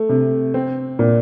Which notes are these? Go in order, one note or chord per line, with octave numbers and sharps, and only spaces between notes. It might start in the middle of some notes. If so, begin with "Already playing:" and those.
Already playing: A3
C3
C4
A#2